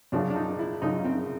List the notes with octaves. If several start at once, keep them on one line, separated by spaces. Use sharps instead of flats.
F#2 C#3 F3 D4
D4
D#4
E4
F#2 C#3 F3 D#4
C4